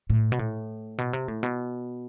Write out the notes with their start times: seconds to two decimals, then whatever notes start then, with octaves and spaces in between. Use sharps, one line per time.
0.10 A2
0.32 B2
0.39 A2
0.98 B2
1.13 C3
1.28 A2
1.43 B2